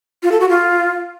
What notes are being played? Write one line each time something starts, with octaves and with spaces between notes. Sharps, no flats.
F4
A4
F#4
F4